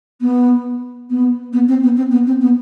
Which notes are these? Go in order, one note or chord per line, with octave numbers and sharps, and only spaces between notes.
B3
B3
B3
C4
B3
C4
B3
C4
B3